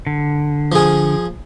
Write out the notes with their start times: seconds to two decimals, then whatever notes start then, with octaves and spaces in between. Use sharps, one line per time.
0.07 D3
0.72 F3 G#4